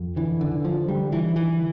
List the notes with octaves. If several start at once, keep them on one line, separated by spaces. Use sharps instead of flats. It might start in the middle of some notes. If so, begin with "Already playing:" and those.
Already playing: F2
D3 E3
D3
D3
F3
D3 G3
E3
D3
E3